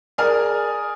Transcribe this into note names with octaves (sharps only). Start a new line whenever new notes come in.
G#4 A#4 D5 G#5 F6